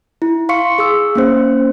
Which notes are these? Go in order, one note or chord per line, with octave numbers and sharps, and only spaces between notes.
E4
F5 C6 C#6 C#7
G#4 E6
A#3 C#4 C5